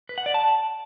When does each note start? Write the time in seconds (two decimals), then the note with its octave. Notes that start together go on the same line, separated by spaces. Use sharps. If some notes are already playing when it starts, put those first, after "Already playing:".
0.09 B4
0.18 F#5
0.26 D5
0.34 A5